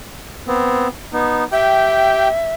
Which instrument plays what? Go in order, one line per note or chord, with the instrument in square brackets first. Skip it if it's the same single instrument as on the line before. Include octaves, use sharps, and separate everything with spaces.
[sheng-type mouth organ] B3 C4
B3 D#4
[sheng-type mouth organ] G4 G5 [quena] E5